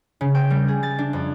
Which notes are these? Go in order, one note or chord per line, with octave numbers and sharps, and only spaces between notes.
C#3
G5
G3
G#4
A6
D4
F2